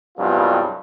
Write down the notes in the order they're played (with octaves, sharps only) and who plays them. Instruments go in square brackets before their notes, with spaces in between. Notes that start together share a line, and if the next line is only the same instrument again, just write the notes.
[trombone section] C2 G2 F#3 G#3 B3 F4